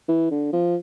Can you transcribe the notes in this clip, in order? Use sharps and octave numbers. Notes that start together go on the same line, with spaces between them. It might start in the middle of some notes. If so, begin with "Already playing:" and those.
E3
D3
F3